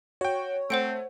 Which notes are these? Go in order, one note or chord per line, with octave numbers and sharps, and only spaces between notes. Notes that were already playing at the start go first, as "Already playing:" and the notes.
F#4 C#5 G5
A3 C4 C5 F#5 D7